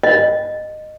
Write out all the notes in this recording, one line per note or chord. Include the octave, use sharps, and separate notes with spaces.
D#5